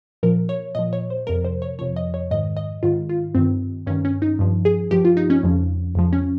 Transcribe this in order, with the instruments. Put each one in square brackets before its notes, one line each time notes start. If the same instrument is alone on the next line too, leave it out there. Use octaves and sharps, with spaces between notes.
[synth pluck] A#2 F3 A#4
C#5
A#2 F3 D#5
C#5
C5
F2 C3 F3 A#4
C5
C#5
F2 C3 F3 C#5
D#5
C#5
G#2 D#5
D#3
D#5
G#2 D#3 F4
F4
G2 D#3 C4
G2 C#4
D#3
C#4
D#4
G2 F3
G#4
G2 F3 G4
F4
D#4
C#4
F2 C#3 F3
F2 C#3 F3
C#4